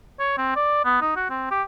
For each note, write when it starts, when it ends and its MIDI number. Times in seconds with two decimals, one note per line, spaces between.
0.19 0.36 73
0.38 0.55 60
0.56 0.83 74
0.85 1.00 59
1.01 1.15 63
1.16 1.26 66
1.30 1.47 60
1.51 1.62 67